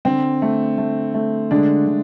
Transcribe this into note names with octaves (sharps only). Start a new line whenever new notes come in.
D3 C4
A3
A3
A3
D3 G#3 D4
D3